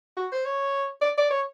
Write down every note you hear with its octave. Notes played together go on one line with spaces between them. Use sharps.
F#4
C5
C#5
D5
D5
C#5